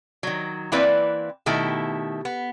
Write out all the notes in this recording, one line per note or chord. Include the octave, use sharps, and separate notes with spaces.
D#3 F#3
E3 A#3 C4 E4 B4 D5
B2 D#3 A3 E4 G4
B3